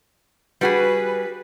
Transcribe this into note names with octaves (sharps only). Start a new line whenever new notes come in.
G3 F#4 G#4 B4